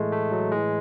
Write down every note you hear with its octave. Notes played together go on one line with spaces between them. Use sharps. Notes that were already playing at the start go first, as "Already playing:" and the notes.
Already playing: A2 E3 G#3 A3
A3
F#3
A2 E3 G#3